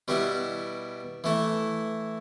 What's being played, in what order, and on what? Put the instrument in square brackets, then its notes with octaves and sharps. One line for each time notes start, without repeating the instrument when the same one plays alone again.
[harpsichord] B2 G3 B3 E4
E3 A3 E4